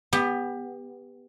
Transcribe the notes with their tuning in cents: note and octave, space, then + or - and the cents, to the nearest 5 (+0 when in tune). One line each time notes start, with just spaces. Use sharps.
B3 +0 G4 +25